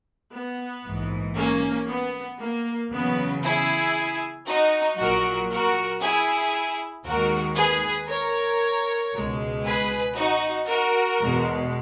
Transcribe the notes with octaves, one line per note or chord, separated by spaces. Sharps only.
B3
A#1 G#2 E3
A#3 C#4
B3
A#3
E2 C#3 F#3 B3
E4 G#4
D#4 F#4
A#1 A#2 F#3 F#4 A#4
F#4 A#4
E4 G#4
D#2 D#3 G#3 F#4 A#4
G#4 B4
A#4 C#5
C#2 B2 G#3
G#4 B4
D#4 F#4
F#4 A#4
E2 B2 G#3